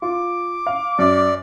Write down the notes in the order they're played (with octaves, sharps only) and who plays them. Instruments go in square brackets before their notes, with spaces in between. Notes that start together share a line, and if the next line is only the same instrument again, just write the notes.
[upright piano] F4 [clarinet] D6
[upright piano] F5
[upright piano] F#2 [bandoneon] D5